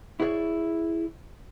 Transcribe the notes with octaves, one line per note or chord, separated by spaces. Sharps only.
E4 F#4 G#4 B4 C#5 D5